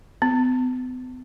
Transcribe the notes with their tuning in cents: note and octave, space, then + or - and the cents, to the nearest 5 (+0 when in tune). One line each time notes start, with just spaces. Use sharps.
B3 +40